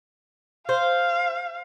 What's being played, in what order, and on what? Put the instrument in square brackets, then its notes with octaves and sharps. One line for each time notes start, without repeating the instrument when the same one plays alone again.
[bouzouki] C5 [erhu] F5